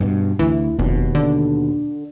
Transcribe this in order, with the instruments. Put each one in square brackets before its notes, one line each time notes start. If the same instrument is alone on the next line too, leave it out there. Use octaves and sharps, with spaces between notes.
[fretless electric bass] G2 B2
[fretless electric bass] D2 [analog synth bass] E3
[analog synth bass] F1 [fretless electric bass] D#2 B2
[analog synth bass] D3